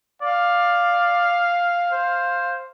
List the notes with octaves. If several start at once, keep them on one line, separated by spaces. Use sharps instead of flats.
D5 F5
C5